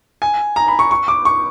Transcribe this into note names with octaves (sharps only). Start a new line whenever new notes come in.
G#5
A#5
B5
C#6
C#6
D6
C#6